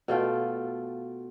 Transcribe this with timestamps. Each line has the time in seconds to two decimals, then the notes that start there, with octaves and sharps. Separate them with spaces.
0.08 B2 A3 F4 G5